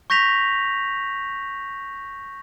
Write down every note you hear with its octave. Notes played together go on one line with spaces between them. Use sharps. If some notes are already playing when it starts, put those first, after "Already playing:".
C#6 G6 A#6 B6 F7